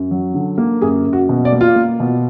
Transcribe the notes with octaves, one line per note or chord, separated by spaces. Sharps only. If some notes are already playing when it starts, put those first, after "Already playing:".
Already playing: F#2
F#3
D3
A#3
F#2 G#4
F#2
F#4
B2
D5
A#3
F4
A#3
B2